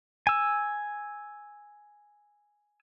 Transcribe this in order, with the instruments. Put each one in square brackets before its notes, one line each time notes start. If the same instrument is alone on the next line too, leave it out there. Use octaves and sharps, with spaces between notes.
[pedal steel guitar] G#5 E6